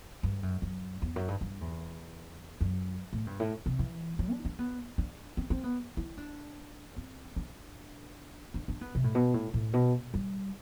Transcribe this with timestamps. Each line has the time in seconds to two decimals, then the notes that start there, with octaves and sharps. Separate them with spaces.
0.23 G2
0.43 F#2
0.62 F#2
1.02 E2
1.16 F#2
1.28 G2
1.41 G2
1.61 E2
2.61 F#2
3.13 A2
3.27 G2
3.40 A2
3.66 C3
3.79 E3
4.19 F#3
4.32 D4
4.45 D4
4.59 B3
4.98 D4
5.37 C4
5.50 C4
5.64 B3
5.97 E4
6.18 D4
6.97 C4
7.36 D4
8.54 D4
8.68 D4
8.81 B3
8.95 C3
9.04 A2
9.15 B2
9.34 A2
9.54 A2
9.73 B2
10.14 G3